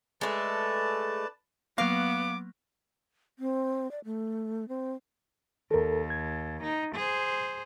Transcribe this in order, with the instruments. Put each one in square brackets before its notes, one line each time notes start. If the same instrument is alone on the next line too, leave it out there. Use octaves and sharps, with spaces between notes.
[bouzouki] G#3 A3 [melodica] B4 D5 A5
[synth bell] F#3 A#3 [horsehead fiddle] B3 [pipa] F5 [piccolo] D6
[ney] C4
D5
A3
C4
[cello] D#2 [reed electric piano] A4 A#4
[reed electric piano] G#6
[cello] D#4
G#4 C5